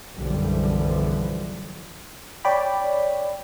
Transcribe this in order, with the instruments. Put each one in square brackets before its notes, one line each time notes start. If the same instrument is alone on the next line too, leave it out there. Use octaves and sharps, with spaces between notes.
[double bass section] B1 F#2 D3 E3 F3 G3
[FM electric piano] C#5 D5 G5 B5